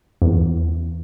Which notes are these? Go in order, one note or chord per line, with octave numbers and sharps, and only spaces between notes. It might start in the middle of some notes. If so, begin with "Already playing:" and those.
E2